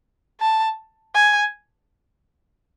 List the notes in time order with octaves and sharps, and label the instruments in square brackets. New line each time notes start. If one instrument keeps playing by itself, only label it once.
[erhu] A5
G#5